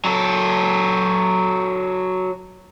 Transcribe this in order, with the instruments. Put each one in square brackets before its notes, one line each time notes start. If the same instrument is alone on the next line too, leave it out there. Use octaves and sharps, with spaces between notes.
[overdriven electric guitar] F#3 A4